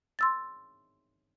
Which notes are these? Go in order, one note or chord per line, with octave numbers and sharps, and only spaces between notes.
C6 E6 A6